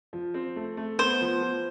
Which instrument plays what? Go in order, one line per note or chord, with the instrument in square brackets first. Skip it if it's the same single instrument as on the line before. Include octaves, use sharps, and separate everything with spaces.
[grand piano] F3
C4
A3
A3
[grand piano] B3 [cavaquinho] C5
[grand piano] F3
F3